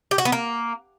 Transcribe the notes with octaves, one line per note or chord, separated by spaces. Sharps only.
G4
F#4
B3
A#3